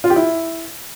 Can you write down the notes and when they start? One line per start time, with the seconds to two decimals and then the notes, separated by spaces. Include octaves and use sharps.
0.04 F4
0.10 G4
0.16 E4